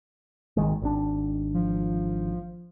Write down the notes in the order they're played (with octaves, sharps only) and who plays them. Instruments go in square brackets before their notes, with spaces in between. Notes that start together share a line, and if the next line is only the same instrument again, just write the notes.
[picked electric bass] G#1 D#3 G#3
G#1 D4
[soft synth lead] F3